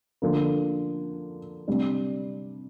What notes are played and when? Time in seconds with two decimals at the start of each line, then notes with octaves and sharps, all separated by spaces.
0.22 D3 F3 A#3
1.68 C3 G3 D4